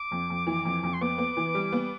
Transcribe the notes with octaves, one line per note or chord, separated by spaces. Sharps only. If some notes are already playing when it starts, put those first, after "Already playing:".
Already playing: D6
F2
F2
E3
F2
F2
C6
B3 D6
B3
E3
G3
B3